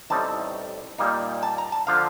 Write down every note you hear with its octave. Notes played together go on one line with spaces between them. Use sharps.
A1 A2 G3 C4 D#4 A5
A#2 G3 A#3 D#4
A5
A#5
A5
D3 F3 F5